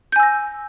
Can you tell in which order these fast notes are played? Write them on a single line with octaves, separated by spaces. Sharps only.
G6 G#5 E6 A#6